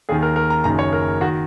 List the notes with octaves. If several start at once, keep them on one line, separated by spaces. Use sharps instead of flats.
D#2 D#3 G#4
A#4
A#4
A#5
F#1 F#2 D#3 A#5
C#5
A#4
D#3 F#4